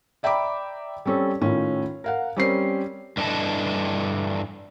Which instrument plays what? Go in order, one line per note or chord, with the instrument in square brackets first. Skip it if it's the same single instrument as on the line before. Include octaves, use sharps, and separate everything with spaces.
[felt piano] D5 E5 G5 A#5 B5 D6
G3 C4 C#4 A4
A2 D#3 C#4 F4
A#4 F5 F#5
G3 C4 C#4 A#4 C5 C7
[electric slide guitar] G2 D4 E4 A4 D#5 A5